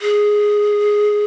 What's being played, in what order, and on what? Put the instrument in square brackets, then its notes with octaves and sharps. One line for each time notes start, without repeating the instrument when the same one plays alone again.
[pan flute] G#4